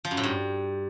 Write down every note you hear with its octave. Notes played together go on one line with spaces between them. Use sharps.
F3
F#2
A2
G2